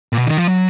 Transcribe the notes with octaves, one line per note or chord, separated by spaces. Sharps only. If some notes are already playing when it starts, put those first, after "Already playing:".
A#2
B2
D#3
F3
F#3